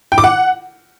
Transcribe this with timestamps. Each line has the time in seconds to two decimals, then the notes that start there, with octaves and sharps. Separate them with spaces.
0.12 G5
0.18 D6
0.24 F#5